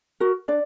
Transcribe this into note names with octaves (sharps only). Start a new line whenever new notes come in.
F#4 A#4
D4 D5